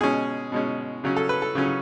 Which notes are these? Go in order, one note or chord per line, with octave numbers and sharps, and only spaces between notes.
B2 G#3 C#4 G#4
B2 G#3 C#4
C#3 F#3 C#4
A4
B4
A4
C#3 F#3 C#4